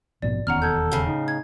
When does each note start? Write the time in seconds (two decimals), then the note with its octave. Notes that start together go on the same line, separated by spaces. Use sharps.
0.22 A#1 G#2 B2 D5
0.47 E1 D#2 B3 C#4 F#5 A#5 F6
0.62 A4 G6 G#6
0.92 A2 C#3
1.06 D#4
1.28 G#6